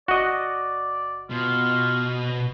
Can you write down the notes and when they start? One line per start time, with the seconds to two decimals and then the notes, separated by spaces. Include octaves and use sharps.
0.08 F#1 F#4 D5 D#5
1.30 B2 F4